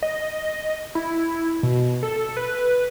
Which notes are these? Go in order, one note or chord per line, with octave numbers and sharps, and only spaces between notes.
D#5
E4
B2
A4
B4